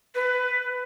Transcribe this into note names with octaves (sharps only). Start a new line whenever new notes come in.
B4